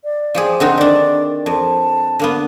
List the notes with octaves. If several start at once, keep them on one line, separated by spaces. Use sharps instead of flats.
D5
F3 G4 G#4
D3 C4 D#4 F#5
D#3 D4 D5
F2 A5
D3 A#3 B3